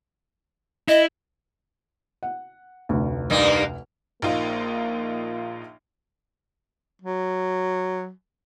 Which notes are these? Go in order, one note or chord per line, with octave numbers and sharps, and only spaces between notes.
E4 D#5
F#5
F1 D2
G2 A#3 D#4
A#1 A#3 D#4 F4
F#3